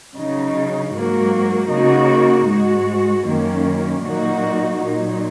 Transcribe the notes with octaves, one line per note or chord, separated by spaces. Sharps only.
C#3 F#3 D#4
G#2 F#3 A#3 F#4
C#3 A#3 D#4 F#4
G#2 G#3 F#4
F#2 D#3 A#3 C#4
A#2 F#3 A#3 D#4 F#4
A#2 F#3 D#4